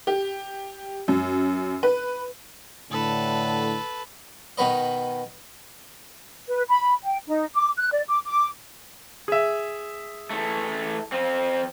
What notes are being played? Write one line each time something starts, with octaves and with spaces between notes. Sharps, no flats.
G4
F#2
B4
A2 D3 A4 B4
B2 D#3 B3 B4 D#5
B4
B5
G5
D#4
D6
F#6
D5
D6
D6
G#4 E5
E3 A3
F3 C4